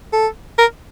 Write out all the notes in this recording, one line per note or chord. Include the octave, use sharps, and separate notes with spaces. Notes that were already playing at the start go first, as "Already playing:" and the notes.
A4
A#4